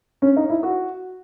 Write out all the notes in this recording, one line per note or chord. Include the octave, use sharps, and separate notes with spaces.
C#4
D#4
E4
F#4